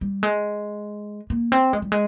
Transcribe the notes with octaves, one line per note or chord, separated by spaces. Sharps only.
G3
G#3
A#3
C4
G#3
G3
G#3